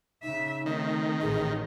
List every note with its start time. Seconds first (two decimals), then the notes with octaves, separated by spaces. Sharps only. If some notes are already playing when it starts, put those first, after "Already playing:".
0.23 C#3 D#4 E5
0.66 D#3 A3 C4 D#4
1.21 A1 A2 G#4